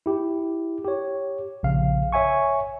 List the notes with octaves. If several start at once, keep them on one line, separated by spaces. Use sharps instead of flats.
E4 G4
G4 C#5
A#1 C#3 F5
C#5 E5 G#5 C#6